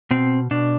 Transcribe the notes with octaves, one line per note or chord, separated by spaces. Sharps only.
B2 C4
B2 D4